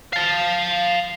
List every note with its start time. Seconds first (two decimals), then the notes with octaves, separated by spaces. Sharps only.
0.13 F5 A5